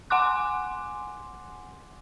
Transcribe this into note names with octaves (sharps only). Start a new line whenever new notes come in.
F#5 G#5 C6 D6 F#6